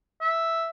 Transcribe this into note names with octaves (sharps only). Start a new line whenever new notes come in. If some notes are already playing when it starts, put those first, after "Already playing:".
E5